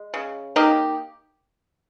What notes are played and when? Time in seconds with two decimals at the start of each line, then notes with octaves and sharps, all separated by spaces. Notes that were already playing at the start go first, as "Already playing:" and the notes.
Already playing: G#3
0.14 C#3
0.56 A#3 D#4 G4